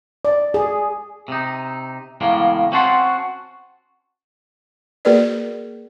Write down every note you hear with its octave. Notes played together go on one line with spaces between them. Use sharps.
D5
G#4
C3 D#4
E2 A2 C#3 G#3 A#3
C4 C#4 F#4 F#5 A5 C6
A#3 F#4 G#4 A#4 B4 D5